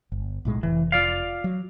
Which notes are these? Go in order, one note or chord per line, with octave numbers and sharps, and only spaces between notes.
G1
B1 A2 G#3
F1 E3
F4 D5 F5
F#3